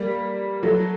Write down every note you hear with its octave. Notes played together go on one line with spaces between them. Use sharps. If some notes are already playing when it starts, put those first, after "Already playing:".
Already playing: G3 A#3
F#3 A3